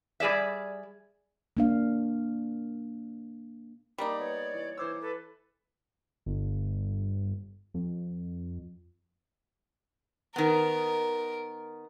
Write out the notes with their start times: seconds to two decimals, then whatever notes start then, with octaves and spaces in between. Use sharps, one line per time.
0.20 G3 G#4 D5 E5
1.57 A#3 D4 F5
3.98 G3 A#3 D#4 D5 D6
4.20 B3 C#5
4.54 E3
4.77 E3 C5 D6 E6
5.01 A4 B4
6.26 G1
7.74 F2
10.36 D#3 B3 A#4